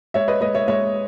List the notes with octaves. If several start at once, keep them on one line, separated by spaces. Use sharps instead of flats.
G#3 C#5 E5
B4 D#5
G#3 B4 D#5
C#5 E5
G#3 C#5 E5